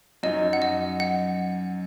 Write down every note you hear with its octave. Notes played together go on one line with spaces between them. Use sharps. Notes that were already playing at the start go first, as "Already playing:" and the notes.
F#2 F#3 D#4 D#5
F#5
D#5
F#5